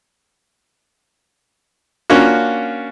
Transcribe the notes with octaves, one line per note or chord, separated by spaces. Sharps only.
A#3 C#4 D4 F4 F#4